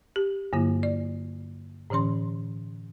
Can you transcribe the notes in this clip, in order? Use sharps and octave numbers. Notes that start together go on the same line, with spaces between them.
G4
G2 D3 F#3 A#3 E4
D5
A2 D3 E3 C#4 C6